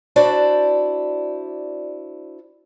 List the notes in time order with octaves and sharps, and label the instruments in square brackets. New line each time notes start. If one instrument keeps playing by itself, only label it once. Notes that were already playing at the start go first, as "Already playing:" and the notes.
[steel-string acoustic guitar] D4 E4 F#4 C5 D5